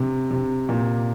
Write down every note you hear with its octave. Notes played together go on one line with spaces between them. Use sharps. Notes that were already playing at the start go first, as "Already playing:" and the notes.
Already playing: C3
C3
A#2